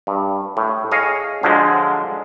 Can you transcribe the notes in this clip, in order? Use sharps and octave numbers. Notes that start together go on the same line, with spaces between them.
G2
A2
G#4 C#5 D#5 F5
D3 F3 F#3 G#3